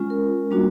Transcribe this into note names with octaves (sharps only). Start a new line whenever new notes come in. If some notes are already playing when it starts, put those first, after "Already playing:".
Already playing: G#3 C#4 F4
A#4
G3 A#3 D4 F#4